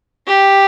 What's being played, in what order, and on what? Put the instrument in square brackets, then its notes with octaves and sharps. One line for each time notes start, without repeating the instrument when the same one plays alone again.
[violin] G4